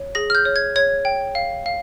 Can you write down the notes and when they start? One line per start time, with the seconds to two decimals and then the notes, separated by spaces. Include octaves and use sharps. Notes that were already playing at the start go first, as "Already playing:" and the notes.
Already playing: C#5
0.15 G#4 A#6
0.30 F6
0.35 G6
0.45 C#5
0.56 G#6
0.76 C#5 G#6
1.05 G5
1.35 F5
1.66 F5